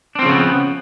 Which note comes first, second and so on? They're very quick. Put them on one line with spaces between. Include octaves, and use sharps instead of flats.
D4 C4 F3 C#3 B3